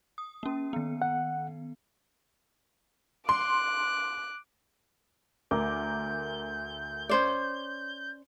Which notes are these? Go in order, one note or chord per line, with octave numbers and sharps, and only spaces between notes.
D#6
A#3 C#4
D#3 B3
F#5
C6 D6 F#6
D2 A#4 D6 G6
C#4 C5 D5